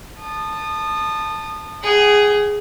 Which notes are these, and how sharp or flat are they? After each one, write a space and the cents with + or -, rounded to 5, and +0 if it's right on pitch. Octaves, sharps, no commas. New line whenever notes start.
A5 +0 D#6 -25
G#4 +0 F#5 +45